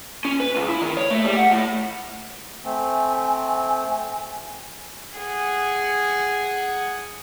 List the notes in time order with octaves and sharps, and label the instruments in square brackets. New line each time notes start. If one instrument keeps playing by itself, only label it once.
[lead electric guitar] C#4
B4
C#2
E4
D#3
C#5
A3
G3
F#5
A2
[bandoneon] A3 C4 [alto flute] G#5
[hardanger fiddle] G#4 F#5